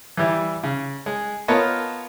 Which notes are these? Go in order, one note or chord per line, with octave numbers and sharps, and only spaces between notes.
E3 G3 E4
C#3
G#3
B3 F4 A#4 C#5 D#5 A5